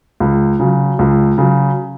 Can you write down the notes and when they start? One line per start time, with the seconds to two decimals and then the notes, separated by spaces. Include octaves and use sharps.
0.20 C#2
0.60 C#3 F#3
0.99 C#2
1.38 C#3 F#3